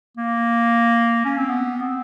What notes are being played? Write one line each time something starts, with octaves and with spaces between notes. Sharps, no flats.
A#3
C#4
C4
B3
C4